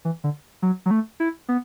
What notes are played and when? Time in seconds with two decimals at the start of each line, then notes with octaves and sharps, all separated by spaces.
0.05 E3
0.24 D3
0.62 F#3
0.86 F#3
0.91 A3
1.20 E4
1.49 B3